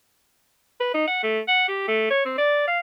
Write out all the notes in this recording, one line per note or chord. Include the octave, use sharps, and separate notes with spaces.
B4
D#4
F#5
A3
F#5
G4
A3
C#5
C4
D5
F5